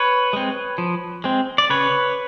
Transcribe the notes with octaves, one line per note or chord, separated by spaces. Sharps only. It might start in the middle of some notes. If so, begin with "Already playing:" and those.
Already playing: B4 C#5
G#3 C4
F3
G#3 C4
D5
C#3 B4 C#5